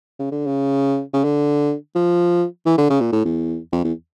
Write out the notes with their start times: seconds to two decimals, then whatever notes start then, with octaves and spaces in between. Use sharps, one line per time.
0.19 C#3
0.32 D3
0.46 C#3
1.13 C#3
1.24 D3
1.95 F3
2.65 E3
2.78 D3
2.90 C#3
3.01 A#2
3.12 A2
3.25 E2
3.72 F2
3.84 E2